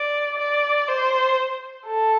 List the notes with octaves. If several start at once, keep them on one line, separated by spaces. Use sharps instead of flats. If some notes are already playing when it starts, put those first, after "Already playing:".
Already playing: D5
D5
C5
A4